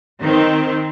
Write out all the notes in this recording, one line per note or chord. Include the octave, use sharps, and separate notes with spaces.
D#3 C4